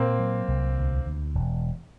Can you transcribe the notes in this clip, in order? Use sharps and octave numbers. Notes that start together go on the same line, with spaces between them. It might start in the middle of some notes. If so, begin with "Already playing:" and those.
Already playing: A#2 A#3 C4
F#3
C2
D2
D2
E1